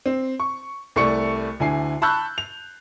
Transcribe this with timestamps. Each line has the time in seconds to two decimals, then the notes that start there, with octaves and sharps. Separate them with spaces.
0.06 C4
0.40 C#6
0.96 C2 A3 D5 C#6 C#7
1.60 D2 D3 E4 G#5 C7
2.02 A5 B5 C#6 E6 F#6 G6
2.38 F7